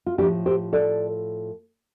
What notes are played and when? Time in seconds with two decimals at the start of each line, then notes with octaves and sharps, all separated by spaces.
0.06 F4
0.18 A2 F3 D4 G4
0.46 G4 C5
0.73 A4 D5